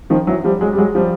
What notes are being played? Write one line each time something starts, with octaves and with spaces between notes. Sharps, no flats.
D#3 F3
E3 F#3
F3 G3
F#3 G#3
G3
F#3 G#3
F3 G3